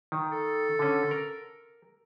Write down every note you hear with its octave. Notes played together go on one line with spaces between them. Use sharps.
D#3
A4
D3 C#4
A#4